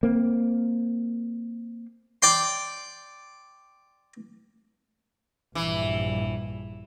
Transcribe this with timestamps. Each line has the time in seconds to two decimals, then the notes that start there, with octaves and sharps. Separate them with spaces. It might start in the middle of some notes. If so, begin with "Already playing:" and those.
0.03 A#3 C4
2.22 D5 G5 C6
5.55 A#1 G2 E3